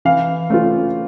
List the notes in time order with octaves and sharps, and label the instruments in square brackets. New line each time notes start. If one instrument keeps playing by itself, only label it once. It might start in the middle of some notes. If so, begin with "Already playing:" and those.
[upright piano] E3 F5
A3 C#4 F4